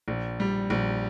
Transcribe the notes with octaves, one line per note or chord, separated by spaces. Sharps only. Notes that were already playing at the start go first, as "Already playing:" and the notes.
A#1
G3
A#1